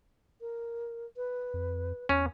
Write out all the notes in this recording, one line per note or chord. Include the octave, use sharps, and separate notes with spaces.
A#4
B4
F2
E2 C#4